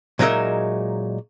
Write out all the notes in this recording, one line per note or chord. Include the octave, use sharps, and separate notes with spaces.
A#2 F#3 G#3 D#4 A#4 E5